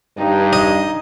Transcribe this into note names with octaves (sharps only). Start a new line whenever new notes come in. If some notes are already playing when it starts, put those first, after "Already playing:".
G2 D#4
D#5